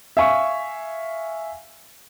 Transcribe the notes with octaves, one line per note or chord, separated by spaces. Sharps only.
E5 F5 G#5 C#6